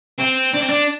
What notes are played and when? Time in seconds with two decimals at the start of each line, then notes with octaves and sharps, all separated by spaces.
0.18 C4
0.53 D4
0.61 C4
0.69 D4